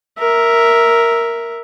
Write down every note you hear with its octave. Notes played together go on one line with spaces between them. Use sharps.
A#4 E5